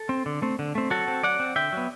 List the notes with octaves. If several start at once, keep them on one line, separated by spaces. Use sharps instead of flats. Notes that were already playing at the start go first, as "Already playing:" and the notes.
Already playing: A4
C4
D3
A3 C4
D3
A3 C4
F#3 F#4 A4
C4
F#3 D5 F#5
C4
D3 E5 G5
F#3 B3